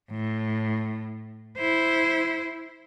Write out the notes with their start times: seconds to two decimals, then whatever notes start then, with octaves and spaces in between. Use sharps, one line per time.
0.11 A2
1.58 E4 C5